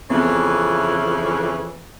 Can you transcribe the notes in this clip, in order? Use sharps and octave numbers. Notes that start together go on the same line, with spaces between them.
F2 C#3 E3 B3 C4